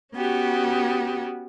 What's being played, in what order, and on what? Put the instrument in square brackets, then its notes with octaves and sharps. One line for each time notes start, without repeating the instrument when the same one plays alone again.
[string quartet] B3 C#4 F#4 G4